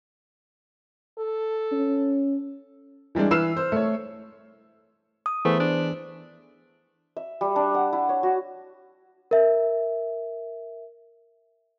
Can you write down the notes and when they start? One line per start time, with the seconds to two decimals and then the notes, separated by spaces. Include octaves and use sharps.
1.19 A4
1.72 C#4
3.15 E3 G3 G#3 D4
3.31 E3 B4 E6 F6 C7 E7
3.57 C5
3.72 A3 C#5
5.26 D#6
5.45 E3 A3 B3 G#4 C5
5.60 D4
7.17 E5
7.41 G3
7.56 D4
7.74 F#5
7.93 E4
8.09 C#5
8.23 F#4
9.31 A#4 E5